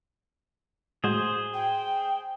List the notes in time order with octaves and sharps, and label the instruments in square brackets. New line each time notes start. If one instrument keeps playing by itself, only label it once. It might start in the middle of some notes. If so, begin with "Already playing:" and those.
[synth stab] A2 G#3 F#4 [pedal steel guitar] G#4 C5
[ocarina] G5